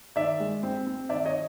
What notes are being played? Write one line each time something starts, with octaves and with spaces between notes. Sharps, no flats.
D#3 D5 E5
G#3
C4
C4
D#3 D5 E5
C#5 D#5